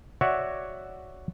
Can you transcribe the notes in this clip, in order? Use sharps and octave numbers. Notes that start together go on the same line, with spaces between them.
F#4 C#5 D5 E5 F#5